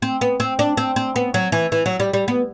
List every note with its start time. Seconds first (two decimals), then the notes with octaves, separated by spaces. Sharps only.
0.02 C4
0.21 B3
0.40 C4
0.59 D4
0.77 C4
0.96 C4
1.16 B3
1.34 F#3
1.52 E3
1.72 E3
1.86 F#3
2.00 G3
2.13 G3
2.28 B3